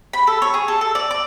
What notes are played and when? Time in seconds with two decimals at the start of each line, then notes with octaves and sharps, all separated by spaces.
0.13 B5
0.27 A4
0.42 C#5
0.54 G#4
0.68 A4
0.81 A4
0.95 D5
1.11 D5